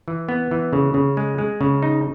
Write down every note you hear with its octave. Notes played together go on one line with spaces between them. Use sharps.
E3
B3
E3
C#3
C#3
G#3
G#3
C#3
D#4